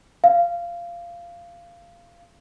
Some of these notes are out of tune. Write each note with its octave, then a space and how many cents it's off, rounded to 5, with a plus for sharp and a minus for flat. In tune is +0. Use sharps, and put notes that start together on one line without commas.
F5 -15